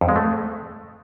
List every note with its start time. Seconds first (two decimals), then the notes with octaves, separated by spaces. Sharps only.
0.01 F2
0.09 G#3
0.16 A3